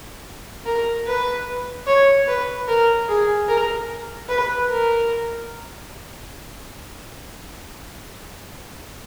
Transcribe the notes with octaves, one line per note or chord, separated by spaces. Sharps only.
A#4
B4
C#5
B4
A#4
G#4
A#4
B4
A#4